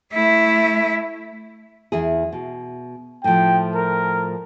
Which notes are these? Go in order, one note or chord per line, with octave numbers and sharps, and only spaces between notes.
A3 E4
E2 E4 G#4
B2
A2 F3 G5
A#4